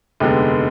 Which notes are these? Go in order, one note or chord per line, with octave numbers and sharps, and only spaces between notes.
F1 D#2 D3 G#3 B3